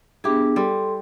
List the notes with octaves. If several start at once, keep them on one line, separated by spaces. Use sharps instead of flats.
B3 D4 E4 G4 G#4
G3 A4 C6